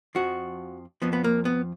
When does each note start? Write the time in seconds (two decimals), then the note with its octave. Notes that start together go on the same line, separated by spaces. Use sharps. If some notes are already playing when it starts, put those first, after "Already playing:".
0.15 F2 F3 F#4
1.02 F2 F3 B3
1.13 B3
1.24 A#3
1.45 B3